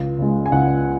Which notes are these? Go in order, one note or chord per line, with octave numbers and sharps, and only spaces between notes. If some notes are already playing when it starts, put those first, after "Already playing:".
Already playing: C#2
C#3 G#3
G#5
C#2 F#5